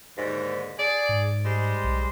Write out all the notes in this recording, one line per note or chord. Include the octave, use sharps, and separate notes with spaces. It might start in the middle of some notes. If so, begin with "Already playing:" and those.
D#2 G#2 D3
G#4 D5
G#2
G3 G#3 C5
B1